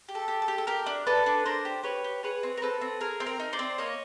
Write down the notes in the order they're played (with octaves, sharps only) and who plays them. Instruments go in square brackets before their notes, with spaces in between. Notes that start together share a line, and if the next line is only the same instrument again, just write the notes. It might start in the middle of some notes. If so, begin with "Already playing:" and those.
[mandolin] G4
A4
G4
A4
G4
A4
G4 A#4
D4
D4 A4 B4
D4
D4 A#4 C5
G4
G4 B4 C#5
G4
G#4 B4 C#5
C4
A#4
C4 A4 B4
C4
G#4 A#4
C4
A#4
D#4
C5 D5
C4
A#3 C#5 D#5